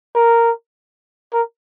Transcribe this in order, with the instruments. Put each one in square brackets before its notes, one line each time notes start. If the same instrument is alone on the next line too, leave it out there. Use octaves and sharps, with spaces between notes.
[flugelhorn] A#4
A#4